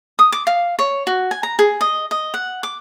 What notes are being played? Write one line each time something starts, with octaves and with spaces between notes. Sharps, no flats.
D#6
D6
F5
C#5
F#4
G#5
A#5
G#4
D#5
D#5
F#5
D6